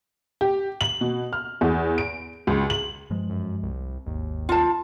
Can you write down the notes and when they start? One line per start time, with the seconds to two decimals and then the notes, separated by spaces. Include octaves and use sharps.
0.41 G4
0.81 F#7
1.01 B2
1.33 F6
1.61 E2
1.98 D7
2.47 C#2
2.70 F#7
3.10 G2 F3 G#3
3.30 F#2
3.63 C2
4.06 G#1 D#2
4.49 F4 A5